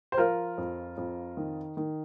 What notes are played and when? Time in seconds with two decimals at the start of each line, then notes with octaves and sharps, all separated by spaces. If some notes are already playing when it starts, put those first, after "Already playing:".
0.12 C5
0.18 F3 F4 A#4
0.58 F2
0.97 F2
1.37 D#3
1.77 D#3